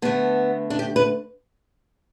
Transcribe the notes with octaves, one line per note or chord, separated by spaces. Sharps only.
D3 A3 B3
D4
G4
B4